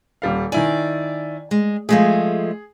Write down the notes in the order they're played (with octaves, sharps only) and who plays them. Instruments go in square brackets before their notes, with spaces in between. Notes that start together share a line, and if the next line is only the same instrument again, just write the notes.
[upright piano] D#1 G3 F5
[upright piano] D#3 E4 G#5 [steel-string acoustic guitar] D5
[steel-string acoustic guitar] G#3
[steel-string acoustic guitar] F3 G#3 A3 [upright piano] G#4